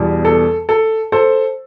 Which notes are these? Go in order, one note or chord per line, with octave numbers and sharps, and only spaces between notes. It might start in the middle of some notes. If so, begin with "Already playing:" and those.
Already playing: E2 B2 G3
A4
A4
A4 C5